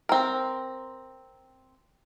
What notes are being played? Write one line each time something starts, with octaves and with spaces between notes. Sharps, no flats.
C4 A#4